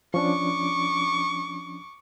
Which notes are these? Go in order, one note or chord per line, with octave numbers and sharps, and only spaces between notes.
F3 C#4 D4 C#6 D6